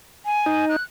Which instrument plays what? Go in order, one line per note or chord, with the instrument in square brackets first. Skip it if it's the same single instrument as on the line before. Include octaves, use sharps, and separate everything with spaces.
[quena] G#5
[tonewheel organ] D#4
[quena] F#6